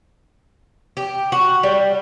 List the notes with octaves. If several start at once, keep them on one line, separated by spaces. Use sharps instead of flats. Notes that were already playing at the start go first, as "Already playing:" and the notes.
G4
F#4
G3